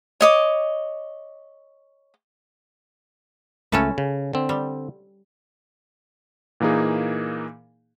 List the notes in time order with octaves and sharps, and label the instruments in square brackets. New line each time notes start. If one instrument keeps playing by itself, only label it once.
[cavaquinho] C#5 D#5 D6
[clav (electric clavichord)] C#2 A3 [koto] C#4 A4 B4
[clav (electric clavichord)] C#3
D3 C4
[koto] G3
[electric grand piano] A#2 E3 A#3 D#4 G#4